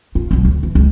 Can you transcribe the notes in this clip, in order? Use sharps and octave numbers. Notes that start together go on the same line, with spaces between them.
F4
B1 F#3
D2
E3
C#2 C3